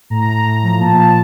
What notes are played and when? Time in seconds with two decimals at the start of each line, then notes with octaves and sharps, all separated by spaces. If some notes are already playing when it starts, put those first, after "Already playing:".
0.10 A2 A#5
0.28 A2
0.45 A2 A#5
0.63 F3
0.80 A#2 A5
0.98 F3